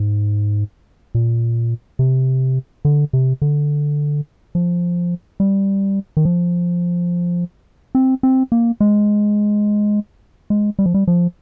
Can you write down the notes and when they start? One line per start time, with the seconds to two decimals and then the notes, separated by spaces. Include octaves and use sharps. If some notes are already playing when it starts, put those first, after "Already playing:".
Already playing: G#2
1.15 A#2
1.99 C3
2.85 D3
3.13 C3
3.42 D3
4.55 F3
5.40 G3
6.17 D#3
6.25 F3
7.95 C4
8.23 C4
8.52 A#3
8.80 G#3
10.50 G#3
10.79 G3
10.86 F3
10.94 G3
11.07 F3